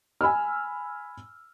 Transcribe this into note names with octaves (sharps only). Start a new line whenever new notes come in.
G#5 B5 E6 F6